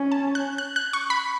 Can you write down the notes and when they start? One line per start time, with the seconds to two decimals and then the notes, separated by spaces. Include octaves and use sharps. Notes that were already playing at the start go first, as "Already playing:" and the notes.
Already playing: C#4
0.12 A5
0.35 F#6
0.58 F#6
0.76 F#6
0.93 C#6
1.10 B5